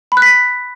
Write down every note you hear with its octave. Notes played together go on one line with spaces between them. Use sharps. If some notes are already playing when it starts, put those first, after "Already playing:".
B5
F#6
B6